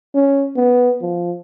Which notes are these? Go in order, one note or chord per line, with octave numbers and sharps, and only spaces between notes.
C#4
B3
F3